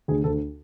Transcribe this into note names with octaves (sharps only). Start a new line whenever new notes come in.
D2 G#4
D2 A4